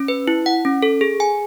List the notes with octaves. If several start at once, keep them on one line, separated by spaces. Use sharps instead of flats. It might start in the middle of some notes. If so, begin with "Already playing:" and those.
Already playing: C#4
B4
E4
F#5
C#4
A4
G#4
G#5